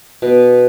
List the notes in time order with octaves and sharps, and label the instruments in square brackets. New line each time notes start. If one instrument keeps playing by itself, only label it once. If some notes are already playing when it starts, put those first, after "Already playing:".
[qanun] B2